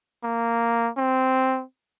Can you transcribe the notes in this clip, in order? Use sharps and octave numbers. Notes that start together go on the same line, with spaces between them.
A#3
C4